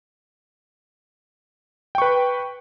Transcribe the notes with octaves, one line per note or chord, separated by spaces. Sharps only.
B4 G5 C#6